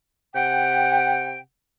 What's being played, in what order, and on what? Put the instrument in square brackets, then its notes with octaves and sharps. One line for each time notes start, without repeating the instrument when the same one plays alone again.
[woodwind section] C3 F#5 G5